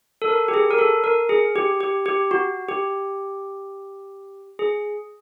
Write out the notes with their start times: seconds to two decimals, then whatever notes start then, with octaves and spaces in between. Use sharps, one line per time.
0.22 A4
0.28 A#4
0.48 G4
0.54 G#4
0.71 A#4
0.78 A4
1.04 A#4
1.29 G#4
1.56 G4
1.80 G4
2.06 G4
2.31 F#4
2.69 G4
4.59 G#4